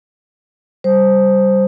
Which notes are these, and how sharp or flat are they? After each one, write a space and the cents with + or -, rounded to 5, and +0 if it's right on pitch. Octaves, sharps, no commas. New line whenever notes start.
G3 -10 C5 +0